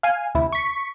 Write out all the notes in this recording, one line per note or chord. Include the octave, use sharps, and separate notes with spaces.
F5 G#5
D2 C3 E4
C#6 B6